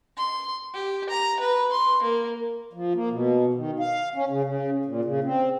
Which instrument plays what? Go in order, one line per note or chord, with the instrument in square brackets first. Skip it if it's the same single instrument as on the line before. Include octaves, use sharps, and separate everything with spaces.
[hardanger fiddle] C6
G4
A#5
B4
C6
A#3
[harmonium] F3
A#3
B2
D#3
F5
C#4
C#3
C#3
A#2
C#3
C4